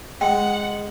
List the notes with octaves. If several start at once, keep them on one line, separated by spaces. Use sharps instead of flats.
G#3 F#5 G5